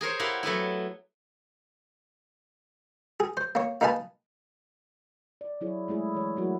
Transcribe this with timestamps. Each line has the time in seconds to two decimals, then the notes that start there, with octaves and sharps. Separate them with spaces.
0.01 G#4 A#4 C5 C#5
0.19 E4 G4 A#4 F5 F#5
0.43 F#3 A3 B3 E4
3.20 G#4
3.37 C5
3.55 A#3 C#5
3.81 A#3 D#4 A#4 B4 G#5 A5
5.41 D5
5.61 F#3 E4 G#4 C#5
5.88 G#3 A3 E4 G#4
6.15 E3 C#5
6.36 E3 F#3 A3 E4 F#4 A#4